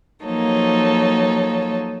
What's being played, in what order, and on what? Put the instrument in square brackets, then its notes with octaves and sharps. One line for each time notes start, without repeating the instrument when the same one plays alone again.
[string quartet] F3 F#3 A#3 D#4 A4 C#5